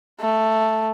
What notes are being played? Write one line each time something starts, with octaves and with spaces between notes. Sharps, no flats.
A3